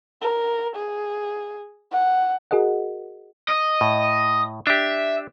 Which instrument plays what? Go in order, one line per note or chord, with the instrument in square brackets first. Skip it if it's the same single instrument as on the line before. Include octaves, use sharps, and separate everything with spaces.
[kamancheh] A#4
G#4
F#5
[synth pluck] F#4 G#4 A#4 D#5 F#5
[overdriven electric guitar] D#5
[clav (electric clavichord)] A2
[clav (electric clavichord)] D4 G4 [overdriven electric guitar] E5